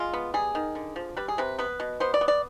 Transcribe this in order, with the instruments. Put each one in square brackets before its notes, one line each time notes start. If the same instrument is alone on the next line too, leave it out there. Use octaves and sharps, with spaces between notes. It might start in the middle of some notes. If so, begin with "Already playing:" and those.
Already playing: [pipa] G#3 F4
B3
G3 G#4
D#3
D3
F3
G3 B4
G#4
C3 B4
B3 B4
B2
B3 C5
D5
B3
D5